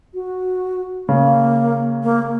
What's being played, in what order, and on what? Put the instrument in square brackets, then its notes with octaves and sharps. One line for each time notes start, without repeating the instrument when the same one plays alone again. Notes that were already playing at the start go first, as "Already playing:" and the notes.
[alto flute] F#4
[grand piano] C#3 [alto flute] A#3
[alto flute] A#3